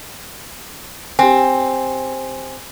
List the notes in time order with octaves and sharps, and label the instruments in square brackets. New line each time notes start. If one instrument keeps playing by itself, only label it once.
[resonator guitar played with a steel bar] C4 [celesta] G4 G#5